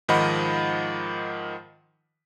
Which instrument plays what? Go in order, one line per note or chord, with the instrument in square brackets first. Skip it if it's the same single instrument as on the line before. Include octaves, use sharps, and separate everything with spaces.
[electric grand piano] G#2 D#3 F3 D#5 F#5 B5